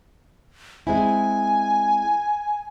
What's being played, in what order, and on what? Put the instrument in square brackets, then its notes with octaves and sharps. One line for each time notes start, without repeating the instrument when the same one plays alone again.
[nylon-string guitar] G#3 C4 E4 [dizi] G#5